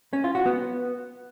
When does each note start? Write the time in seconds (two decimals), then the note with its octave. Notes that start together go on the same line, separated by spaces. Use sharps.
0.13 C#4
0.24 F4
0.35 F#4
0.46 B3